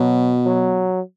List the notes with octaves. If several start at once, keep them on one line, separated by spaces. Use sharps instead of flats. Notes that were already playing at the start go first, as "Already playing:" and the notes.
Already playing: B2 F#3
F#3